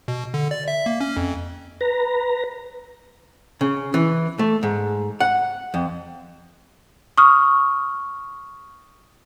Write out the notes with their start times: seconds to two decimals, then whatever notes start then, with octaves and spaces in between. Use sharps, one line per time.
0.08 B2
0.34 D3
0.51 D5
0.68 E5
0.86 A#3
1.01 C#4
1.17 F2
1.81 B4 A#5
3.61 C#3
3.94 E3
4.39 A3
4.63 G#2
5.20 F#5
5.74 F2
7.18 C#6 D#6 F6